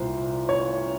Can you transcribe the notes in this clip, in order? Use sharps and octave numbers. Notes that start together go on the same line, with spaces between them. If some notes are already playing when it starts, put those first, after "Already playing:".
Already playing: C2 A#2 C5
C#5